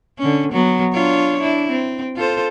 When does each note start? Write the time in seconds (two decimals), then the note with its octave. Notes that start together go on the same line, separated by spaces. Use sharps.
0.19 D3 C#4
0.52 F#3 B3
0.93 D4 F4 C#5
1.39 D4 E4
1.71 C4
2.16 F4 A4 C5